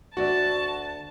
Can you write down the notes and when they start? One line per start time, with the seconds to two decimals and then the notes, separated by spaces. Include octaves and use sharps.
0.17 D2 F#4 D5 E5 A5